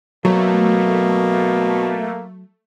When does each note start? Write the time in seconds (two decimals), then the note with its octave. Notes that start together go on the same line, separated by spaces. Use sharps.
0.25 B2 F#3 A3 A#3